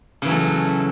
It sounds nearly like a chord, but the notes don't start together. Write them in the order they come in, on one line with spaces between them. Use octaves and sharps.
C#3 E3 F#3 A3